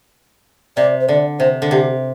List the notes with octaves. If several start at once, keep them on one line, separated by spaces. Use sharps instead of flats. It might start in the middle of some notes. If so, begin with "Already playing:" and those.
C3 D5
C5
D3 D5
C3 C5
D3
C3 G4